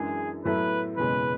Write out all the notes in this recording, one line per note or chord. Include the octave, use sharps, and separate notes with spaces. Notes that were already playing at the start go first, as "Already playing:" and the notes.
Already playing: F#2 E3 G#3 D4 G#4
A2 F#3 B3 E4 A4 B4
F#1 E2 B2 G#3 C#4 B4